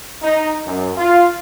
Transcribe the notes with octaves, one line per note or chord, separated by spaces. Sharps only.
D#4
F#2
F4